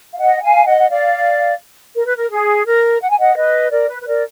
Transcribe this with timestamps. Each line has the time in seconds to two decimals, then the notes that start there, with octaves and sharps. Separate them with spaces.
0.13 F5
0.19 D#5 F#5
0.37 F#5
0.42 F5 G#5
0.66 D#5 F#5
0.79 F#5
0.89 D5 F5
1.95 A#4
2.05 B4
2.16 A#4
2.31 G#4
2.65 A#4
3.01 F#5
3.09 G#5
3.18 D#5 F#5
3.35 B4 D#5
3.71 A#4 D5
3.89 B4
4.02 B4
4.07 A#4 D5